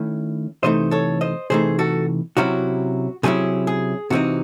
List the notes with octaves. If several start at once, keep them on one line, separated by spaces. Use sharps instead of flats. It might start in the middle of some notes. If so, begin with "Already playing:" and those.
Already playing: D#3 A3 C#4 E4
C3 E3 A3 D#4 C5 D#5
A4 C#5
C5 D#5
C3 E3 A3 D#4 G#4 C5
F#4 A4
C3 F#3 C#4 E4 F#4
C3 F#3 C#4 E4 G#4
G#4
C3 E3 C4 D#4 F#4